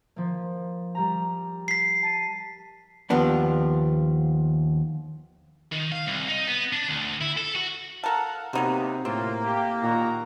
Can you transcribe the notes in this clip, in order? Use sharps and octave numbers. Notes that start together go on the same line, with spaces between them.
F3 A#3
G3 G4 A#5
B6 C7
A5 D#7
D#2 F3 B3 D4
D#3
F5
C2
D#4
B3
D4
D2
E4
A4
F#4
A4 A#4 F5 F#5 A5
C3 F#3 A#3 B3 D#4 F#4
A2 C#3 A3 A#3 C4 F4
G4
A#2 D#3 F#4 A#5